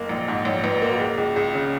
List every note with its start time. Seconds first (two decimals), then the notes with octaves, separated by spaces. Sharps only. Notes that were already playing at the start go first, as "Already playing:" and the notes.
Already playing: F#1 A#3
0.09 A#1
0.28 G#2
0.45 A#1 C#5
0.64 A#1 B4
0.82 A#3 A#4
0.91 F#4
1.00 C#2 G#4
1.17 C#2 G#4
1.36 C#2 G#4
1.54 C#3